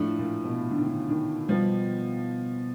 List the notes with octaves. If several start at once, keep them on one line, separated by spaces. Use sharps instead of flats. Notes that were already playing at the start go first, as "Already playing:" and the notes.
Already playing: A2 F3 A3 D4
A#2
B2
D3
D#3
D3
D#3
B2 F3 G3 B3